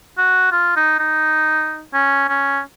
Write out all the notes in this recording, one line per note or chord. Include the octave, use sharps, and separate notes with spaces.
F#4
F4
D#4
D#4
C#4
C#4